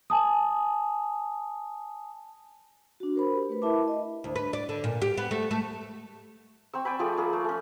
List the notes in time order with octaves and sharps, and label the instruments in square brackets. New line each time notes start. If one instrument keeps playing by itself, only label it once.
[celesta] G#5 A5 D#6
[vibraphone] D4 F#4
A#4 C5 B5
G4
A3 B4
E4 A#4 E5 A5 B5 D6
D#5
[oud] D2
B4
D5
D3
A#2
G4
B3
A3
A3
[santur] C4 C#6 E6
D5 G5 G#5 B5
F3 A3 G#4 D5
A#3 G#4
A3
A3 C#4